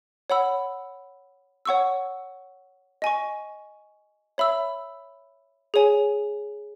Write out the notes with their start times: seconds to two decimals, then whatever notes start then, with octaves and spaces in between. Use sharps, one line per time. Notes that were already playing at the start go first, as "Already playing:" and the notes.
0.30 C#5 F#5 B5 E6
1.65 C#5 F#5 C#6 E6
3.02 D#5 G#5 C#6
4.38 C#5 E5 B5 E6
5.74 G#4 C#5 G#5